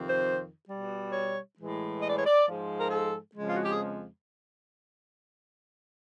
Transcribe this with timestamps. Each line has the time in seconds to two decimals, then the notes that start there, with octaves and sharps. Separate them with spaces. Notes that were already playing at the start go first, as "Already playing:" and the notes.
Already playing: F2 C3 D#3
0.09 C5
0.68 B2 G3
1.12 C#5
1.57 A2 E3 G#3
2.02 D#5
2.09 D5
2.18 C#5
2.26 D5
2.46 G#2 F3 G#3
2.80 A#4
2.91 A4
3.35 F2 C#3 F3 G#3
3.47 F4
3.56 F#4
3.63 G4
3.71 G#4